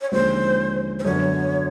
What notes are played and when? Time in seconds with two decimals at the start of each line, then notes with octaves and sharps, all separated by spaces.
0.01 C#5
0.12 D#2 D3 F3 G#3 C#4 C5
0.99 C5
1.04 F#2 D3 F#3 B3 C#5